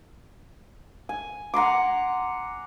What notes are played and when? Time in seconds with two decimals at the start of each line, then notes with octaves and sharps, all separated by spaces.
1.09 G#5
1.54 F#5 A#5 C6 D6